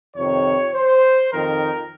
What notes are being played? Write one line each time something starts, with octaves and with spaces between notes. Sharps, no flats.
F2 C3 D#3 C#5
C5
F2 D#3 A#4